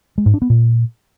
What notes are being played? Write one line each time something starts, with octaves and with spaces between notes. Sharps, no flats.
G#3
G#2
D4
B3
A#2